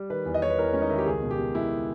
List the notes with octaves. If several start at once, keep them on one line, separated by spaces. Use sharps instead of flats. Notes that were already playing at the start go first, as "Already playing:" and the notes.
Already playing: G3
D#3 B4
E2
D#5
E2 C#5
B4
E2 A#4
G#3 C#4
D#4
D#3 E4
G4
C#2 G#4
B2
G4
B2
G#3 E4